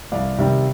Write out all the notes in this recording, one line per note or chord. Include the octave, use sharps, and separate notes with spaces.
C2 D5 F5
C3 D#3 G3